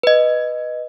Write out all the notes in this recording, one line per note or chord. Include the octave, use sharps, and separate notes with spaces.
B4 D#5